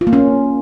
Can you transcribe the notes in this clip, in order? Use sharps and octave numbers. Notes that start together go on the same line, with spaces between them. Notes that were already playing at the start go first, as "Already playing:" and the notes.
F4
A#3
C#4